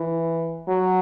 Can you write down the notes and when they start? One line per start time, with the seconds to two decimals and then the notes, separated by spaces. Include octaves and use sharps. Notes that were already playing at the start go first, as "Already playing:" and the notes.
Already playing: E3
0.68 F#3